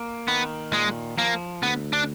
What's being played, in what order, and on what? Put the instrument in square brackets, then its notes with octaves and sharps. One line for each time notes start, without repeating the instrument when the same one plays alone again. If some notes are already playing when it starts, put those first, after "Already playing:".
Already playing: [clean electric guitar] A#3
[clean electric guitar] D#3 [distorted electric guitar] B3
[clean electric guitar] A#2 [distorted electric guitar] G#3
[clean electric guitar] F3 [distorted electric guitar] A#3
[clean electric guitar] D2 [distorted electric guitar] B3
[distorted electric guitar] D4